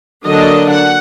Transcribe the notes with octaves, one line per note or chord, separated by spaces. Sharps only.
D3 F#3 A#3 D4 D#5
F#5